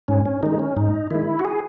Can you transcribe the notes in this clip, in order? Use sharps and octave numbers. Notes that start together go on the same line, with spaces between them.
G#2 C#4
C#4
D#3 G#3 D#4
C#4
G#2 D#4
D#3 G#3 E4
F#4
G#4